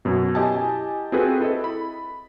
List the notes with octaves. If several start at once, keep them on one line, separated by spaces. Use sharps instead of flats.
F#2 B2
E4 G4 D#5 G#5 A5
C4 F4 F#4 G#4 A4 B4
E4 A4 D#5
B5